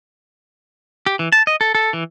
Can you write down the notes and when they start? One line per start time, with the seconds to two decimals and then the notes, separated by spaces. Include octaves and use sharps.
1.06 G4
1.19 E3
1.32 A5
1.47 D#5
1.61 A4
1.75 A4
1.93 E3